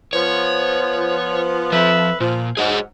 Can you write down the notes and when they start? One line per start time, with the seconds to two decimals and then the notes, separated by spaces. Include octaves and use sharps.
0.13 F3 B3 C#5
1.72 F2 F3 B4 E5
2.20 A#2 F3
2.57 G#2 F#3 G#4 D#5 F#5